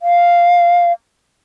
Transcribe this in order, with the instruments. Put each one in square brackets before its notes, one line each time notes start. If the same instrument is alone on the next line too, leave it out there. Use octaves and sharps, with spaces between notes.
[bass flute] F5